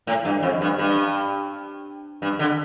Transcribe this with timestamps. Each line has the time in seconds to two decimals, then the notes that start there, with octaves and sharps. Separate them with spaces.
0.07 A2
0.25 G2
0.43 F2
0.61 G2
0.78 G2
2.22 G2
2.39 D3